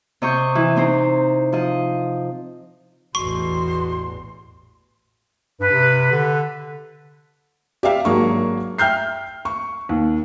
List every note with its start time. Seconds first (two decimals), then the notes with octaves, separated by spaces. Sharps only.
0.22 C3 D#5 C#6 G6
0.55 E3
0.76 C4 D#4 C5
1.52 F3 D#5
3.15 A1 E2 B2 C6 C#6
5.60 G2 B4
5.71 C3
6.12 D3
7.83 G4 D5 E5 F5 G5
8.05 G#1 F#3 A#3 D4 G#4 C#6
8.78 E5 G5 F6 G6 C7
9.45 C#6
9.89 D#2